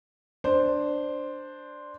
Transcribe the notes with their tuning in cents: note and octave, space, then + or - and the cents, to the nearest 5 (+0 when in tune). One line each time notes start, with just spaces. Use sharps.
D4 +5 C5 +0